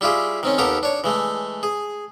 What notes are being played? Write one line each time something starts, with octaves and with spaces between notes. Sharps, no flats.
G3 E4 F4 G4 G#4
D#3 C4 C#4
D#2 B3 G4 A4 A#4 A#5
D4 C#5
E3 G#3 A3
G#4